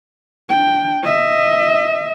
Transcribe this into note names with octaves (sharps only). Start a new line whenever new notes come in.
D4 G5
D#5 E5